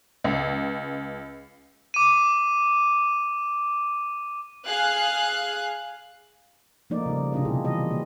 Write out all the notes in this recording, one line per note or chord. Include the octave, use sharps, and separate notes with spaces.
C#2
D6 D#7
G#4 F5 F#6
F3 A3 A#3 D#4 D5
C#3 G3
C3 C4 D4 F4 D#5
B2 E4 G#4
E3 G3 G#4 D#5
A#3 B3